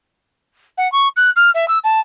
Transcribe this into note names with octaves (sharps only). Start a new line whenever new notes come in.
F#5
C#6
F#6
F6
E5
E6
A5